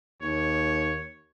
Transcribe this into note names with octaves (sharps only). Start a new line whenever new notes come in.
D#2 C#5